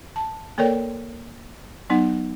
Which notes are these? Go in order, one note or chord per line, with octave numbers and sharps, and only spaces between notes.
A5
A#3 A4 A#4 C#5 D5 G5
F#3 B3 D#4 F#5